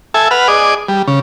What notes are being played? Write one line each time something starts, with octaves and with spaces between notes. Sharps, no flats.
A4 E5 G#5
B4 F#5 F6
G#4 D5 D#5
G3
C#3